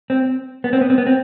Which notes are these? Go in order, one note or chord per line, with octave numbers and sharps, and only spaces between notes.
C4
B3
C4
B3
C4
B3
C4